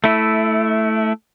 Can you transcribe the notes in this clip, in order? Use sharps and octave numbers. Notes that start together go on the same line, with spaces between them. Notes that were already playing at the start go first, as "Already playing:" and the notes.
A3 E4